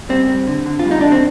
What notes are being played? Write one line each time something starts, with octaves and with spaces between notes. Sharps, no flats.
G3 C4
G3
D3
D3
F4
G3
D#4
D3 D4
C4